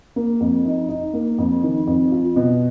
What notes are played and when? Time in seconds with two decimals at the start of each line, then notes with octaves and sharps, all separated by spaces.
0.16 A#3
0.40 F2
0.66 D#4
0.89 D#4
1.14 A#3
1.38 F2
1.63 D#3
1.87 F2
2.12 F4
2.36 B2